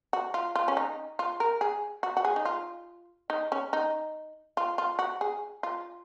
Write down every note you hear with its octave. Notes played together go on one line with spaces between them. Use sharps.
F#4
F4
F4
C#4
D#4
F4
A#4
G#4
F#4
F#4
G#4
D#4
F4
D#4
C#4
D#4
F4
F4
F#4
G#4
F4